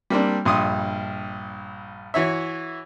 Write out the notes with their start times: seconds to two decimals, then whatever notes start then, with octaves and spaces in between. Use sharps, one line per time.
0.10 G3 A#3 C4 D4
0.45 A#1 G2 C6 D#6
2.14 E3 F#4 C#5 E5